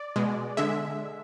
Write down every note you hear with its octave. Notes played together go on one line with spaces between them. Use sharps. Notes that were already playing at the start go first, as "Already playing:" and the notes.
Already playing: D5
B2 G#3
D3 G#3 E5